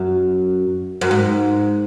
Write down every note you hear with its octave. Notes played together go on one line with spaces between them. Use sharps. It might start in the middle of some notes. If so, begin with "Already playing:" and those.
Already playing: F#2
F#2
G#2